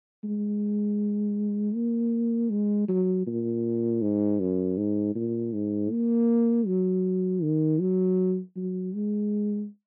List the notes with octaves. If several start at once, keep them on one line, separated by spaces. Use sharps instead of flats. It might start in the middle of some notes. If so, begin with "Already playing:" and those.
G#3
A#3
G#3
F#3
A#2
G#2
F#2
G#2
A#2
G#2
A#3
F#3
D#3
F#3
F#3
G#3